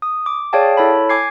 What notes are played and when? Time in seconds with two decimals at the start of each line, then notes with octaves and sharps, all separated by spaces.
0.02 D#6
0.26 D6
0.53 G#4 C#5 D5 F5 G5 A5
0.77 E4 A4 C#5 A5 B5
1.09 G#5 D6 G#6 C7